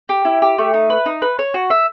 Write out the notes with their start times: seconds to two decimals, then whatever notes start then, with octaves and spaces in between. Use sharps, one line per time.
0.09 G4
0.25 E4
0.42 G4
0.58 A3
0.74 D#4
0.90 B4
1.06 D#4
1.22 B4
1.39 C#5
1.54 F#4
1.70 E5